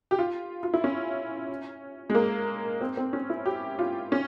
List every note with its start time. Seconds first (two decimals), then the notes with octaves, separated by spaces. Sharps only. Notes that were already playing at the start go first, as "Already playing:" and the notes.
0.11 G4
0.19 F4
0.63 F4
0.74 E4
0.84 C#4
2.10 G#3
2.15 A#3
2.81 C4
2.97 C4
3.13 C#4
3.30 E4
3.46 G4
3.79 F4
4.12 C#4